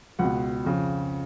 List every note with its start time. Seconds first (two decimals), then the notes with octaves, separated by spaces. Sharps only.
0.19 C#2 B2 F#5
0.65 F2 C#3